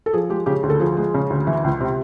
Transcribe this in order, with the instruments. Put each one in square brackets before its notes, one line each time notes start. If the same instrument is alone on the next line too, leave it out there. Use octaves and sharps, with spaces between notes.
[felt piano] A4
F3 G#4
G#3 G4
C#3 G4
D2
A4
F3 G#4
G#3
C#3
D2
E3
C#2
C3